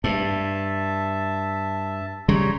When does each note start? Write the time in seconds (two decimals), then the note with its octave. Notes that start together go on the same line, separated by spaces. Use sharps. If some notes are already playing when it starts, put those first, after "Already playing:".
0.04 G2 E5 A5
2.28 C#3 G3 C#5 A#5 C6